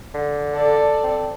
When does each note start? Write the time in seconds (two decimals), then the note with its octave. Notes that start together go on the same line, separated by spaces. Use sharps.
0.14 D3
0.55 A4 D5
1.04 C4